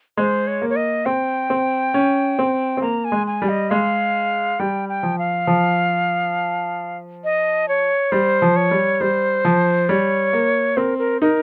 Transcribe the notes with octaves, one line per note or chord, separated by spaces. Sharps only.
G#3 C5
C#5
A#3
C#5
D#5
C4 G5
C4
C#4
C4
C4
A#3 A#5
G#5
G#3
G#5
G3
D#5
G#3 F5
G3 G5
G5
F3
F5
F3
D#5
C#5
G3 C5
F3
C#5
G3
G3 C5
F3
G3 C#5
A#3
C4 A#4
A#4
D#4 A#4